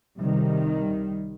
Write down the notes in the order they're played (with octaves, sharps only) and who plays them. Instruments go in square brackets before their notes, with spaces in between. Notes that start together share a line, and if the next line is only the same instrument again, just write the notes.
[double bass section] C2 C3 D#3 G3